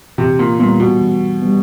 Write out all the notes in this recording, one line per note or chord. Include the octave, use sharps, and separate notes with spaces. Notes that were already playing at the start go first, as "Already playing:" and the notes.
C3 E3
A#2
A#2 G3 B3
B2
E3
G3 B3